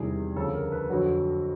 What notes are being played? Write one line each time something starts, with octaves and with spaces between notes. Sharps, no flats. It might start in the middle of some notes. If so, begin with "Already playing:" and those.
Already playing: E2 C3 D#3 G3 G#4
D2 C#3 F3 A4
A#4
B4
F2 D3 F#3 F#4